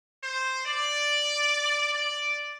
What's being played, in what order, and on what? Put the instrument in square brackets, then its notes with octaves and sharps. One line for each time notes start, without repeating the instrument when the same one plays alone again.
[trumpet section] C5
D5
D5